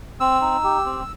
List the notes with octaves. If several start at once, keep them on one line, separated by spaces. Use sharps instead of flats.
C4 E6
D#4
G4
C4